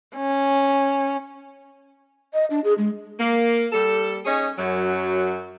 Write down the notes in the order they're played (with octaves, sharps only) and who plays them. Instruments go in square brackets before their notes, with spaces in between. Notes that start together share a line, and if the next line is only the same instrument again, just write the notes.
[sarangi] C#4
[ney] D#5
D4
G#4
G#3
[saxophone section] A#3
G3 A4
C#4 D#4 G#4 C#5
F#2 F#3